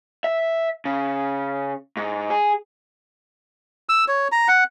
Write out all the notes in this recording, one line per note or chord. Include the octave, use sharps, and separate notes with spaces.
E5
C#3
G#2
G#4
E6
C#5
A#5
F#5